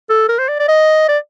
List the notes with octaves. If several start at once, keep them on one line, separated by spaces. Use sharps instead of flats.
A4
A#4
C5
D5
D5
D#5
D5